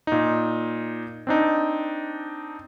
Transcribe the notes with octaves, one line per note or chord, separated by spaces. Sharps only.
A#2 D#4
C4 D4 D#4